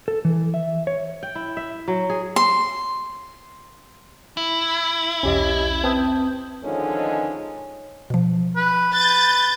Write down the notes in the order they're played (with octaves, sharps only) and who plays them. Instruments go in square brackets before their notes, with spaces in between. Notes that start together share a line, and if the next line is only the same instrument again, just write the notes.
[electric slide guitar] A4
E3
E5
C#5
[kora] G5
E4
E5
F#3
G#4
[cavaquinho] C6
[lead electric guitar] E4
[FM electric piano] B1 E2 [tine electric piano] C#4 G4 D#5
[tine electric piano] C4 B4 [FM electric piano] A5 D#6 G6
[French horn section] D3 D#3 F3 G#3 C#4 D#4
[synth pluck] B2 F3
[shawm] B4
[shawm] B4 [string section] G6 A6